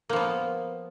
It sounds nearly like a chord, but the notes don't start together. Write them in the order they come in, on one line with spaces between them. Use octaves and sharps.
A#3 F3 B3